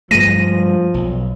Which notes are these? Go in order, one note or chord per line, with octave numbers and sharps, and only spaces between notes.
G2 F3 G#3 A3 A#6 D#7
B1